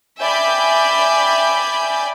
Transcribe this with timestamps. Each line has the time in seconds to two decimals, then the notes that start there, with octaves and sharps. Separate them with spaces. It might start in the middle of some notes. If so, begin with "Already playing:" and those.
0.21 D5 E5 G5 G#5 B5 G6